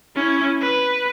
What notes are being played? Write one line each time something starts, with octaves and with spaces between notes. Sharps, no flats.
C#4 E4
B4